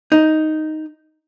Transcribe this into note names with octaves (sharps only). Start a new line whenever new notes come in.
D#4